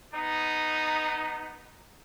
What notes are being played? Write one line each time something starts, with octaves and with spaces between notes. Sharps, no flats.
B3 D#4